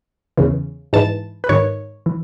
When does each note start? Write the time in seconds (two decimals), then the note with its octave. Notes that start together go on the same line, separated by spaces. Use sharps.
0.38 E2 C#3 E3
0.93 G#2 E3 A5
1.44 B4
1.49 G#2 D#3 C#5
2.06 E3